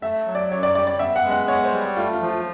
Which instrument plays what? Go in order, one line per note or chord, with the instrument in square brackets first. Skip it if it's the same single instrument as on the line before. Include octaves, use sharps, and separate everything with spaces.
[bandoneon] A3 [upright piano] E5
[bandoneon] F#3
[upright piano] D5
[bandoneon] F#2 [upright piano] C#5
[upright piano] D5
[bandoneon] G3 [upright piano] D5
[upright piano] D5
[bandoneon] B3 [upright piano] E5
[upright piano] F#5
[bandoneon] G#3
[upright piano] F#5
[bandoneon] B3 [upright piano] C#5
[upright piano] C5
[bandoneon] G3
[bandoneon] A3 [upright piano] F4
[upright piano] F4
[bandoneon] F3
[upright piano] F4